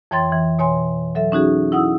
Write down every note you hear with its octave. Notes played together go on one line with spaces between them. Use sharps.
F2 E3 C#5 G5 C6 A6
E3
B2 C#5 G#5 C6
F#3 A4 E5
C#4 D#4 F#4 G#4
E4 F#5 D#6 E6